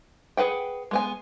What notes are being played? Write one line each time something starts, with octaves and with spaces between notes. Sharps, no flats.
G#4 B4 F#5 G5
G#3 B3 G#5